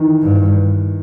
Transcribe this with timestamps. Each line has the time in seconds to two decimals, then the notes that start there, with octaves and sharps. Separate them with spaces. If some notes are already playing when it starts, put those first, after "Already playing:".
Already playing: D#3 E3
0.22 G2